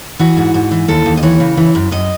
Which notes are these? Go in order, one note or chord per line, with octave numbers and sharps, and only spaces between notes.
E3 F#4
G#2
G#2
E3
D#2 A4
D#2
D#5
E3 C#5
C#3
E3
F#2
F#2 D#5